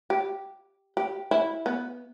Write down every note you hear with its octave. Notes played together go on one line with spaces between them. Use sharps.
G4
G4
E4
B3